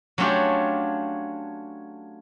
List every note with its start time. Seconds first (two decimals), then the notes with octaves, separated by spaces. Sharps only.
0.18 F#3 A3 C#4 D4 F4 G4